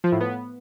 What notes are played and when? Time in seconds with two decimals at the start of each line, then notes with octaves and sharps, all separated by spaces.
0.04 F3
0.12 A2
0.20 B3